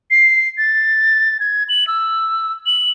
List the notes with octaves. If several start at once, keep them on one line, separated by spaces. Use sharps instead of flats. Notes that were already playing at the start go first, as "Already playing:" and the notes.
C7
A6
G#6
F#7
E6
F#7